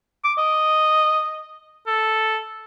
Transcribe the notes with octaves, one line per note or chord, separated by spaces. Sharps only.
D6
D#5
A4